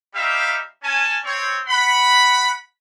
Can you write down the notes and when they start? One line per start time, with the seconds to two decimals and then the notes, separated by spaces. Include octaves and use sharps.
0.14 G3 C4 D#4 G4 E5 F5
0.83 C#4 G#5 A5
1.24 C4 C#5
1.67 F#5 B5